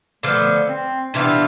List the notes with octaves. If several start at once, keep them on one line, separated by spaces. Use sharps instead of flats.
D3 F3 A3 B3
C4
C3 E3 B3 D4 F4